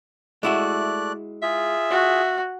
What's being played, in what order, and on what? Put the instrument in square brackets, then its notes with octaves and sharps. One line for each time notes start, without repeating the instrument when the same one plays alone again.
[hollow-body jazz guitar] G#3 E4 F#4 [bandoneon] A3 D5 F#6
[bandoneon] F4 G#4 [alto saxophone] E5
[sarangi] F#4